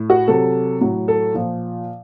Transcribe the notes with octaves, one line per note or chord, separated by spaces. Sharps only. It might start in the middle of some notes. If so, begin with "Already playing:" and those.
Already playing: A2
F#4
C3 F#3 A4
A2 F#3
A4
A#2 F3